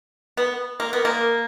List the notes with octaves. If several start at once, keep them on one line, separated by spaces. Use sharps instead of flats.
B3
A#3
B3
A#3